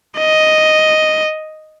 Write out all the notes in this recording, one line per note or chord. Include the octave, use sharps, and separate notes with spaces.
D#5